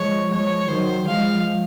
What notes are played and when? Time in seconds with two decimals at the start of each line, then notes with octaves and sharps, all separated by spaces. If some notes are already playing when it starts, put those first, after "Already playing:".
Already playing: F3 G#3 C#5
0.30 F3 G#3 C#5
0.68 D#3 F#3 C5
1.07 F3 G#3 F5